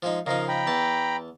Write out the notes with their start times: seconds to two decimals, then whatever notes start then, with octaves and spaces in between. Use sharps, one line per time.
0.03 F3 G#3 D#4
0.26 C#3 F3 D#4 A#4 D#5 F5
0.48 G5 A#5 B5
0.67 E2 A5